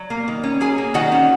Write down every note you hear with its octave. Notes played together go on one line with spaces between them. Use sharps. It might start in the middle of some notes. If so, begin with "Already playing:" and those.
Already playing: F#3
A#3
D#3
C#4
F#3 G#4 G#5
A#3
D#3 F#4 F#5
C#4